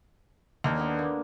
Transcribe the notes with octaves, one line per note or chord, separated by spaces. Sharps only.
D#2 D4 A#4
D3 B3
A#3